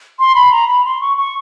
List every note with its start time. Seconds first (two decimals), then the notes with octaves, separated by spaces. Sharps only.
0.19 C6
0.35 B5
0.51 A#5
0.67 B5
0.85 C6
1.01 C#6
1.17 C#6